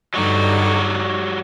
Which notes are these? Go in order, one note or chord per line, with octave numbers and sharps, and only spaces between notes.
G2 D3 F#3 G3 D#4 F#4